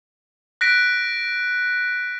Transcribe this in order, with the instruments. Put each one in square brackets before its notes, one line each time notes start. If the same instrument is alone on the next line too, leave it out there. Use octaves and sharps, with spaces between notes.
[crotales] F#6 A#6 B6 D7